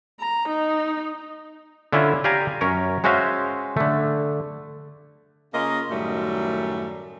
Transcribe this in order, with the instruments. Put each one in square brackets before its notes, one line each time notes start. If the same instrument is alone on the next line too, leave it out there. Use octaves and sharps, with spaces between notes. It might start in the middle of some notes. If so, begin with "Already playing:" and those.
[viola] A#5
D#4
[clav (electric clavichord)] D3 C#4 E4 F4 E5
G4 D5 F5 G#5 A#5
F#2 C#4 A#4 C#5
G#3 C#4 F#4 C5 E5 F5
D3 A3
[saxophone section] C#3 A#3 C#4 F4 D#5
F#2 A2 D#3 F#3 G3 A3